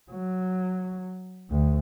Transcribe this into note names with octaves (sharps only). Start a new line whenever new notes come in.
F#3
D2